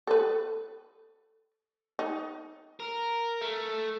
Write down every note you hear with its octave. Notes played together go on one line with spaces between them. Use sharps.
A4 B4
D#4
A#4
A3